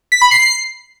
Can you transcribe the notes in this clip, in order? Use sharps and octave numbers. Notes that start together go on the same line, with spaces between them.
B6
B5
C7